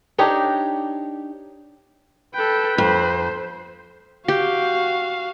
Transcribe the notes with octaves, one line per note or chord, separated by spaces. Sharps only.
D4 D#4 G4 C#5
A4 B4 G5
F2 C5
F#4 G4 F5